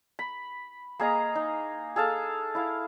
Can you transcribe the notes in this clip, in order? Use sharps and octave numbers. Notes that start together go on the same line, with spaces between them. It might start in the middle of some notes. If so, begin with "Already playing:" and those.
B5
A#3 G#4 D#5 A#5
D#4
G#4 A4 F5 A5
E4 F5